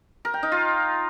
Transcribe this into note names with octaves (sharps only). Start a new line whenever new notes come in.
A#4
G5
D#4
F4